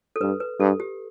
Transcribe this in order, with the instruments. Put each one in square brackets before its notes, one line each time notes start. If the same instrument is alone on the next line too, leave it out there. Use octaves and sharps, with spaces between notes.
[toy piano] A4
[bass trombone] G2 [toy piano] B4
[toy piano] B4
[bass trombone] G2 [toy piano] A4
[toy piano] G4